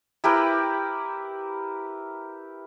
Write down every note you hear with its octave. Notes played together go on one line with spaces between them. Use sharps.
E4 G4 A#4 B4